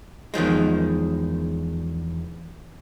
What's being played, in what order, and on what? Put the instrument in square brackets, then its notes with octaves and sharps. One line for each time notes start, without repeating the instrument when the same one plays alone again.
[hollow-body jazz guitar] E2 D#3 F3 G#3